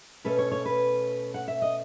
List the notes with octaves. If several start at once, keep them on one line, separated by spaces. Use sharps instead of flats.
B2 A3 C#4 B4
C#5
C#5
B4
F#5
E5
D#5